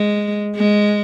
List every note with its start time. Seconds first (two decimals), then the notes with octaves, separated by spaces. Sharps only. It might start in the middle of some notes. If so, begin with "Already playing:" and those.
Already playing: G#3
0.56 G#3